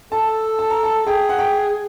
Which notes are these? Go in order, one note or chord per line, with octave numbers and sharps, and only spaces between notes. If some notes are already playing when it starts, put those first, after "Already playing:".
A4 A5
A5
A#5
A5
G#4 G5
F#5
G5